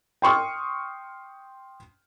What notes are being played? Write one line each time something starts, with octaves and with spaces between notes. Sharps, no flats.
G5 C6 C#6 D#6 F6